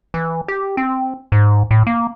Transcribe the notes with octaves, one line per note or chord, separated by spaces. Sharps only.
E3
G4
C4
G#2
A2
A#3